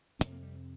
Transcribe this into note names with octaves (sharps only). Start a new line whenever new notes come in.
F1 F2 C3 C4
A#3
G3